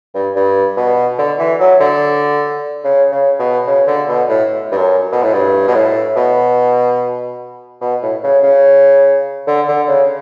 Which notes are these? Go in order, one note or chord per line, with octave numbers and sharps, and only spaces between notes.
G2
G2
B2
D3
E3
F#3
D3
C#3
C#3
B2
C#3
D3
B2
A2
G2
F#2
B2
A2
G2
B2
A2
B2
B2
A2
C#3
C#3
D3
D3
C#3